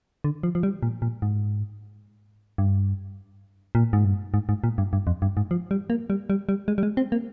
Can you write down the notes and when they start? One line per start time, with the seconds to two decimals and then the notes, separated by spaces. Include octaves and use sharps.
0.24 D3
0.43 F3
0.55 F3
0.63 G3
0.83 A#2
1.02 A#2
1.22 G#2
2.58 G2
3.75 A#2
3.93 G#2
4.05 G2
4.34 G#2
4.49 G#2
4.64 A#2
4.78 G2
4.93 G2
5.07 F2
5.22 G2
5.37 G#2
5.51 F3
5.71 G3
5.90 A#3
6.10 G3
6.30 G3
6.49 G3
6.68 G#3
6.78 G3
6.83 G#3
6.97 C4
7.12 A#3